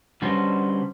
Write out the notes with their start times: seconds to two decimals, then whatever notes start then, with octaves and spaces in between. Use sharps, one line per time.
0.22 D3 G3 C#4 F#4 B4 C5